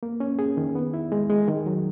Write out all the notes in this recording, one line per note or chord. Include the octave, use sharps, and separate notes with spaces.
A#3
C#4
G#4
D#3
B3
E4
G#3
G#3
D#3
F#3